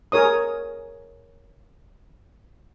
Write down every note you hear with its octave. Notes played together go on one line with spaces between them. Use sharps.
G#4 A#4 C#5 D#6